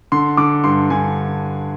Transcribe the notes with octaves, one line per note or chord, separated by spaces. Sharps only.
D3 C6
D3 D6
G2 C6
D3 G#5